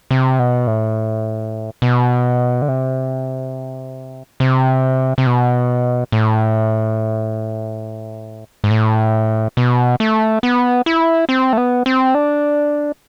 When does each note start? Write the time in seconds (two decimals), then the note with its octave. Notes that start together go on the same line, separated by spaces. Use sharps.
0.11 C3
0.39 B2
0.67 A2
1.82 B2
2.62 D3
2.68 C3
4.40 C3
5.18 C3
5.27 B2
6.12 A2
8.64 G#2
8.71 A2
9.57 B2
10.00 A3
10.43 B3
10.86 E4
11.29 C4
11.53 A3
11.57 B3
11.86 C4
12.15 D4